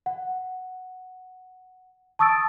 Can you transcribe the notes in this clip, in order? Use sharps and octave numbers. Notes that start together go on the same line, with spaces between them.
F#5
A5 C#6 D#6 E6 A6 D7